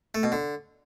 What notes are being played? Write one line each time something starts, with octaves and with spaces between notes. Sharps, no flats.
A3
B2
D3